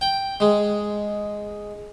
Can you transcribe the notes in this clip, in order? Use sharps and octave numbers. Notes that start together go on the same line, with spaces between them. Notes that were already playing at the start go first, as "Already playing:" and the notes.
G5
G#3